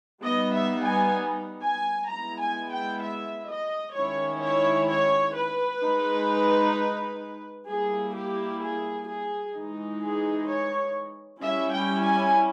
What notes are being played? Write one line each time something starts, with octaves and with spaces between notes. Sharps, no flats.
G3 B3 D#4 D#5
E5
G#5
G#5
G#3 B3 E4 A#5
G#5
G5
E5
D#5
D#3 G#3 C#4 E4 C#5
C#5
C#5
B4
G#3 D#4
G3 A#3 E4 G#4
G4
G#4
G#4
E3 G#3 D#4
G#4
C#5
G3 C#4 E4 E5
G5
G#5